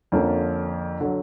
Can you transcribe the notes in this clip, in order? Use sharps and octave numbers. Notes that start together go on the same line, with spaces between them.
F2 D3 F3 A#3 C#4
D3 F#3